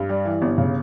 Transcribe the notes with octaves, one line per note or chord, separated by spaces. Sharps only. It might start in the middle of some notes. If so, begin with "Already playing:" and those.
Already playing: G2
G3
E3
G1
C#3